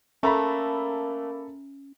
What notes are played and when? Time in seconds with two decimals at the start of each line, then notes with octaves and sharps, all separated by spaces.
0.23 A3 A#3 C#4 A4 A#5 B5